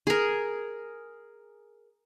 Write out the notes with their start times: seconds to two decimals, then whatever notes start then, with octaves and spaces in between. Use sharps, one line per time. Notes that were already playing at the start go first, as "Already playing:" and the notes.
0.07 G#4 A#4